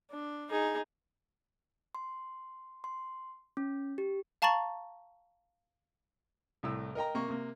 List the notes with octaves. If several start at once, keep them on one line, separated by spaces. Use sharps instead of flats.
D4
D#4 G#4
C6
C6
C#4
G4
F5 A5 A#5 C#6 A6 F#7
C2 A2 E6
A#4 D#5 G5 A#5
C3 A#3 C#6
C3 A#3